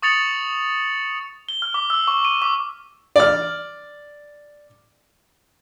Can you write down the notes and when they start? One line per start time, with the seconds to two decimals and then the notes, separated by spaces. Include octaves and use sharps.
0.02 C#6 D#6 A6 C#7 F7 F#7
1.49 G7
1.62 F6
1.74 D6
1.90 E6
2.08 C#6
2.25 D#7
2.42 D6
3.16 D5 F6